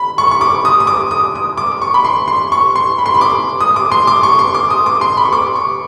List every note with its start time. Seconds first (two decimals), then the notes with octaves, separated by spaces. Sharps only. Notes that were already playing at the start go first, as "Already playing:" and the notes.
Already playing: B5
0.18 C#6
0.31 C#6
0.41 D6
0.65 D#6
0.80 D#6
0.87 D6
1.11 D#6
1.36 D#6
1.58 D6
1.82 C#6
1.94 B5
2.04 C6
2.28 C6
2.52 C#6
2.76 C6
2.98 B5
3.06 C6
3.14 B5
3.21 D6
3.61 D#6
3.76 D6
3.92 C6
4.07 D6
4.23 C#6
4.39 C6
4.54 D6
4.70 D#6
4.86 D6
5.01 C6
5.17 B5
5.25 C#6
5.32 D6
5.55 C#6